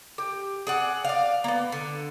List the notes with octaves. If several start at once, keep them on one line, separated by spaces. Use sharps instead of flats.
G4
G#4 D5 F#5
D5 F5
A#3 B3
D3